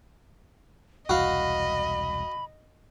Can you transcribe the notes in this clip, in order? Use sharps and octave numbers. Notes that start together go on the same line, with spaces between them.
E1 C2 F#4 D#5 F5 B5